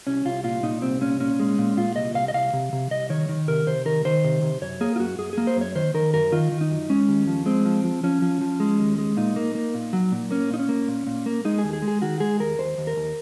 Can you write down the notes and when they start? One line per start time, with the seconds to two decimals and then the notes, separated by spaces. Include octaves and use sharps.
0.07 C2 C#4
0.25 C2 F4
0.44 A#2 F4
0.63 A#2 D#4
0.82 C2 C4
1.01 A#2 C#4
1.20 A#2 C#4
1.39 G#3
1.58 A#2
1.77 A#2 F4
1.96 C2 D#5
2.15 C2 F5
2.28 D#5
2.34 C2 F5
2.53 C3
2.73 C3
2.91 C2 D#5
3.10 D#3 C#5
3.29 D#3
3.48 C3 A#4
3.67 C3 C5
3.86 D#3 A#4
4.05 D#3 C5
4.24 C3
4.42 C3
4.62 F#2 C#5
4.81 A#3 G#4
4.96 F4
4.99 F#2 F#4
5.18 F#2 G#4
5.33 A#3 G#4
5.47 C5
5.56 F#2 C#5
5.75 D#3 C5
5.94 D#3 A#4
6.14 F#2 A#4
6.32 D#3 F4
6.52 D#3
6.61 D#4
6.71 F#2
6.90 G#3 C#4
7.08 D#2
7.27 F3
7.46 G#3 C4
7.65 F3
7.84 F3
8.03 F3 C#4
8.22 F3
8.41 F3
8.60 G#3
8.79 D#2
8.98 G#3
9.17 A#2 D#4
9.36 A#3
9.55 A#3
9.74 A#2
9.93 F#3
10.12 A#2
10.31 A#3 C#4
10.50 A#2 D#4
10.59 C#4
10.69 A#3
10.88 A#2
11.07 A#2
11.26 A#3
11.45 G#3 D#4
11.59 G#4
11.64 D#2
11.73 G#4
11.82 G#3
11.88 G#4
12.02 D#3 F#4
12.20 G#3 G#4
12.39 D#2 A#4
12.59 D#2 C5
12.78 D#2
12.87 A#4
12.96 D#2